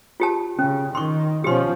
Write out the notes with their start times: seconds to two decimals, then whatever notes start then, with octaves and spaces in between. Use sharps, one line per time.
0.20 F4 G4 A5
0.59 C#3 C#4
0.95 D#3 C6 C#6
1.44 B2 F3 C#4 G4 C6